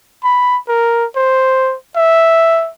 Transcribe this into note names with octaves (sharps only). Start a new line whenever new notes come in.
B5
A#4
C5
E5